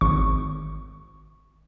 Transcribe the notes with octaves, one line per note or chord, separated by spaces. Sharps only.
G#1 C#6